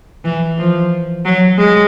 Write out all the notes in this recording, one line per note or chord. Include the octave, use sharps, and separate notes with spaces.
E3
F3
F#3
G#3